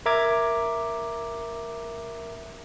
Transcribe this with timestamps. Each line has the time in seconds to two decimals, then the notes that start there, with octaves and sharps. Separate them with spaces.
0.06 A#4 E5 A#5 D6 G#6